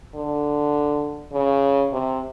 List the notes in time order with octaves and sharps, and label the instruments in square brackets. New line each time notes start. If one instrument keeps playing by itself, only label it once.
[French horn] D3
C#3
C3